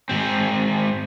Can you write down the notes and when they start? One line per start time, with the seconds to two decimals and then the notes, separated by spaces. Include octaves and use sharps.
0.09 G#2 C4